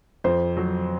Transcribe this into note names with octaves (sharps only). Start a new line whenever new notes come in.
F2 C5
F#3